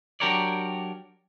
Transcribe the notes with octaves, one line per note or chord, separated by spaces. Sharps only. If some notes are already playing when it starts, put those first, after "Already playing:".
F#3 D4 G4 A#4 C#5 D5